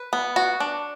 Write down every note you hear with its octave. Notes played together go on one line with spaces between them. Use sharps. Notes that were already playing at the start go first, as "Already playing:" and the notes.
Already playing: B4
B3
F#4
D4